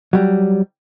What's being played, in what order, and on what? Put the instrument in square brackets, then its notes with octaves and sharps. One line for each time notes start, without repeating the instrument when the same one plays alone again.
[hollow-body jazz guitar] F#3 G3